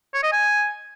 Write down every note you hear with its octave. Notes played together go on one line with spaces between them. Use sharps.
C#5
D#5
G#5